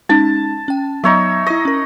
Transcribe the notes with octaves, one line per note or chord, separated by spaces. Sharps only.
G#3 C#4 D#4 A5
C#4 G5
F#3 B3 D#4 C#5 E5
E4 D#5 C#6
C#4 A#4